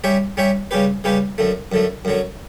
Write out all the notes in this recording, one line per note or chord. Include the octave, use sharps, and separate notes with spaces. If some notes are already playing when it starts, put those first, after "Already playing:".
G3 C#4 G4 C#5 E5
G3 C#4 G4 C#5 E5
C#3 G3 C#4 G4 B4
C#3 G3 C#4 G4 B4
F#2 D3 A3
F#2 D3 A3
F#2 D3 F#3